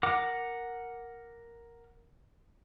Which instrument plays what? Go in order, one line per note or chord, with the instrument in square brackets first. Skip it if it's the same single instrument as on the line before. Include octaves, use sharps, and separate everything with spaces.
[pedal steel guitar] A#4 F#5 D6